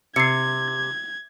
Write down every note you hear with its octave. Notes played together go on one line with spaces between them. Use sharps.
C3 G#6 C7 C#7